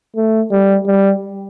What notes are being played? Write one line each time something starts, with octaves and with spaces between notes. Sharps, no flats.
A3
G3
G3